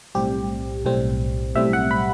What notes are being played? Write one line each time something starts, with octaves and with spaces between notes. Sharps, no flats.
B1 A2 G3 C4 G4
B1 A2 G3 C4
B1 A2 G3 C4 E5
F#5
B5